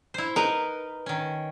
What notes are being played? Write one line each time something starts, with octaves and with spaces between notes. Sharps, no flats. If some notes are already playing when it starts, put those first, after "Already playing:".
E4 C5
D#4 A#4 B4
D#3 C#4